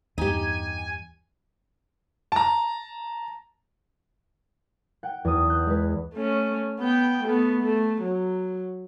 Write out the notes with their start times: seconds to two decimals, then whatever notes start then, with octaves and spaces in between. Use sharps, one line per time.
0.18 E2 G2 D#4 G4 G#5 G#6
2.32 A5 A#5
5.03 F#5 G5
5.25 E2 D#6
5.49 F#6 G6
5.67 G#3 B4
6.14 A3 C#4
6.79 B3 G5
7.24 A3 B3
7.61 A3
8.02 F#3